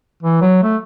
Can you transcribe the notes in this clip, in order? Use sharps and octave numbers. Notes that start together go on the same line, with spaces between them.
E3
F#3
A3